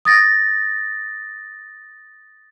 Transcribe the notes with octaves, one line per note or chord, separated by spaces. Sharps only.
D#6 A6 A#6